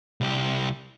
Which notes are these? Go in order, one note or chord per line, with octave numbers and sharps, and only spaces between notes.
C2 G4